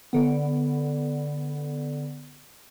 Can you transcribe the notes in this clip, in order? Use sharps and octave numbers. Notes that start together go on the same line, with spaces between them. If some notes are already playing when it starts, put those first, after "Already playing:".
D3 B3